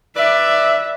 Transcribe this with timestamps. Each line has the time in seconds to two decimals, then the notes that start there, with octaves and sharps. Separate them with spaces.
0.17 B4 D5 E5